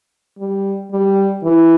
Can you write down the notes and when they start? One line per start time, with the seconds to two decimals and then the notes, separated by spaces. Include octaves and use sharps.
0.39 G3
0.91 G3
1.43 E3